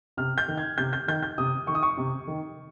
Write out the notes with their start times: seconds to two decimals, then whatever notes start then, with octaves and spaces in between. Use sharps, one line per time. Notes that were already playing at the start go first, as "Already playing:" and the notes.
0.17 C3 F6
0.38 G6
0.48 D#3
0.58 G#6
0.78 C3 G6
0.93 G6
1.08 D#3 G6
1.23 G6
1.38 C3 D#6
1.67 D#3 C#6
1.75 D#6
1.83 C#6
1.97 C3
2.27 D#3